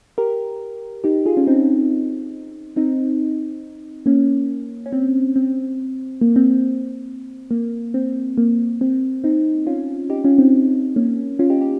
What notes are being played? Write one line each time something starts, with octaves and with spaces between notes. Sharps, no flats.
G4 A#4
D#4 G4
F4 G#4
C#4 F4
C4 D#4
C4 D#4
A#3 C#4
C#4
C4
C4
A#3
C4
C4
A#3
C4
A#3
C4
C4 D#4
C#4 F4
D#4 G4
C#4 F4
C4 D#4
A#3 C#4
C#4 F4
D#4 G4
D#4 G4